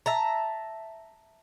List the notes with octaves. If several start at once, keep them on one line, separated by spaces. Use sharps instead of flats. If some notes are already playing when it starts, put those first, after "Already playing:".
E5 A5 A#5